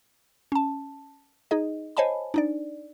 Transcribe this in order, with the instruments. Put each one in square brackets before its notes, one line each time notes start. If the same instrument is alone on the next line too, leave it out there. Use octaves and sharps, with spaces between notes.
[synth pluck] C#4 A5
D#4 G#4 D#5
C5 C#5 D#5 G#5 A5 B5
D4 D#4 D5